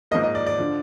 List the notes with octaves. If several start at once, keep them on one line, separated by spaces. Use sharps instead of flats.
G#2 F3 A#3 D#5
D#5
D5
D5
D3 F3